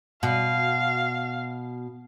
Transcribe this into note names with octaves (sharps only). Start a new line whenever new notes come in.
B2 F5